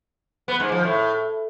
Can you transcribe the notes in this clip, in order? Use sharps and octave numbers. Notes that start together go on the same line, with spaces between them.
B3
G#2
F3
A2